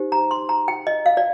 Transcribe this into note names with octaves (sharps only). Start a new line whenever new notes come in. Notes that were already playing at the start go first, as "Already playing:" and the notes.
Already playing: D#4 G4 C5
A#5
C6
A#5
G5
D#5
F5
D5